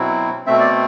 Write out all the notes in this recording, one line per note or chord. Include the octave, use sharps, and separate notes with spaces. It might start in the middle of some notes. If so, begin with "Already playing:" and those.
Already playing: B2 F#3 C4 E4
B2 A3 C4 E5
D5